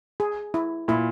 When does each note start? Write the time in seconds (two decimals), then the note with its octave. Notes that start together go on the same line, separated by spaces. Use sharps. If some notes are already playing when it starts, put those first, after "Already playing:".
0.20 G#4
0.54 E4
0.88 A#2 E4